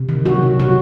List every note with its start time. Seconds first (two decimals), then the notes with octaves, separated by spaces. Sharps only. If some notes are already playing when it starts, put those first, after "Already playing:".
Already playing: C3
0.09 D#3
0.26 F#3 F#4
0.43 C3
0.59 C3 F#3 F#4